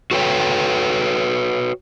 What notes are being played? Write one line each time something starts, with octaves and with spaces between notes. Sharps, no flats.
F#4 A4 B4 C#5 G5